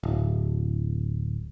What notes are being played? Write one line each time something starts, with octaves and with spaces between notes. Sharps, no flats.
D1